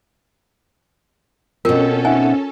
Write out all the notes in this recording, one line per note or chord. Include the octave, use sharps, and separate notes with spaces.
B2 C4 C#4 F4 A4 A#4
D#4 E5 F#5 G#5